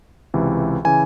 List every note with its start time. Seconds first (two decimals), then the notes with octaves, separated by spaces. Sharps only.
0.34 C#2 C3 E3
0.85 C#3 E3 G#5